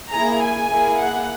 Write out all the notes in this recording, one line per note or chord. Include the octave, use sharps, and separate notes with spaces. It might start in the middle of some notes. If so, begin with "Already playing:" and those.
A#3 E4 G#4 A#5
G#5
A#3 E4 G#4
F#5